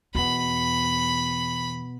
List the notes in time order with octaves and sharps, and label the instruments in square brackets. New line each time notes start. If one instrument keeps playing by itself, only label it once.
[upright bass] E2 [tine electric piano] B2 B3 [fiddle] B5